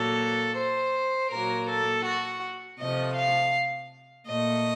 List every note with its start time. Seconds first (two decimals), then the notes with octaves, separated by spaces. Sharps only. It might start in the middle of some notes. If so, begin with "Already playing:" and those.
Already playing: A#2 F#3 A#3 A4
0.57 C5
1.31 A#2 F#3 A#3 A#4
1.69 A4
2.05 F#4
2.79 C3 F3 A3 D#5
3.17 F5
4.27 A#2 A3 D#5